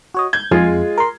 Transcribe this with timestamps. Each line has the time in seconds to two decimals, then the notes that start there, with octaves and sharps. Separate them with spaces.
0.14 F#4 C#5 D#5
0.33 G6 G#6
0.51 F2 G#3 F4 G#4
0.98 A#4 C6